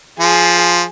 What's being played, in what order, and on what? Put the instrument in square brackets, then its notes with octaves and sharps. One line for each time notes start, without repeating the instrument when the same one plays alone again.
[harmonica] F3 [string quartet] G#4